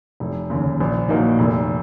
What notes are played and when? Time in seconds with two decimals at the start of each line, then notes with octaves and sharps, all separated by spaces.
0.20 F1
0.50 D#2 C#3
0.80 A#1
1.09 A#2 F#3 A#3 D#4
1.39 F1